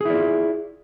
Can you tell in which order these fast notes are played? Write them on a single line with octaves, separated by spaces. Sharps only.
G#4 E4 D5 F4